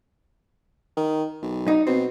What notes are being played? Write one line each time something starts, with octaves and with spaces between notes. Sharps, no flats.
D#3
B1
D#4
B2 C4